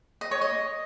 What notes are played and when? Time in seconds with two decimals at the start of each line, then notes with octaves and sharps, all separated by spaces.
0.21 D#5
0.31 C#5
0.41 D#5